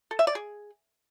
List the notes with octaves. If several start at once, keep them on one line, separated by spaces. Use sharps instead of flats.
A4
E5
D5
G#4